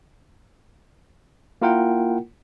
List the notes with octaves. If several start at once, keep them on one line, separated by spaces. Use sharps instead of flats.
A#3 E4 F4 A#4 F#5 G5